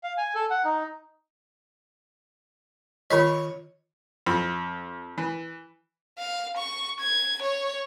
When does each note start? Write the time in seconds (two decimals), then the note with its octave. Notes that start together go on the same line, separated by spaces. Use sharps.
0.03 F5
0.18 G#5
0.35 A4
0.50 F#5
0.65 D#4
3.10 D#3 F4 C#5 D#5
4.26 F2
5.18 E3
6.18 F5
6.57 C#6
7.00 G#6
7.42 C#5